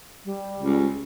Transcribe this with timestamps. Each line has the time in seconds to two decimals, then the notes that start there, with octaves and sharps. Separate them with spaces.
0.25 G3
0.59 C#2